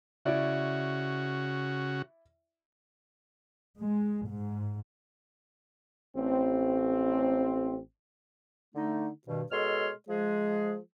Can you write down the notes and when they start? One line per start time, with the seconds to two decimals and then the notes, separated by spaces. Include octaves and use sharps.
0.26 C#3 E4 F#4 D5 E5
3.80 G#3
4.29 G#2
6.16 A1 C4
8.75 D3 A3 D#4
9.28 G2 B2 D#3
9.52 B2 G#3 A4 C#5 C6 F6
10.09 F3 G#3 G#4